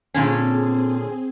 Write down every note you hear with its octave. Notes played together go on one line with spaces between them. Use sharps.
A#2 D3 C4 C#4 G#4